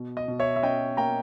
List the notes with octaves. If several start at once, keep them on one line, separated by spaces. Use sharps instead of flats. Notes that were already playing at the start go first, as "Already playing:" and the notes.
Already playing: B2
D#5
B2
C#5 E5
E5
C#4 D#5 G5
A#3 G5 A#5